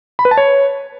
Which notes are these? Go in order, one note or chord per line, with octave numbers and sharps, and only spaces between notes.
B5
B4
A5
C#5